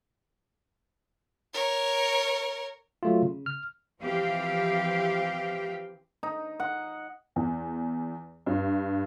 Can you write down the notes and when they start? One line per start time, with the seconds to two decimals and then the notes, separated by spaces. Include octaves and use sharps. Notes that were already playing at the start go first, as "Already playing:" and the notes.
1.54 A#4 C#5
3.03 F#3 A3 F4
3.22 C#3
3.46 F6
4.01 E3 F3 C4 G4 F5
6.23 D#4
6.60 F#5
7.36 E2
8.46 G2